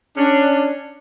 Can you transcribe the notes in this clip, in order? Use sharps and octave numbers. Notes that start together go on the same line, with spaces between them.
C#4 D4